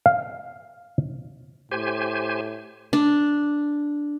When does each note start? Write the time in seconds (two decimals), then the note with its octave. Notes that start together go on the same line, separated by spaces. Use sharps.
0.06 F5
1.72 A2 G4 C5 G#5
2.93 D4